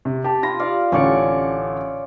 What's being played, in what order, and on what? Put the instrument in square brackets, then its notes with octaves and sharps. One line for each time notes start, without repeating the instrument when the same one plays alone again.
[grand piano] C3
G4 A5
[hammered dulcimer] F4 [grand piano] B5 A#6
[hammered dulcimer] D5 F5
[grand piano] A1 D3 C#5 [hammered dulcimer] C#4 D5 C#6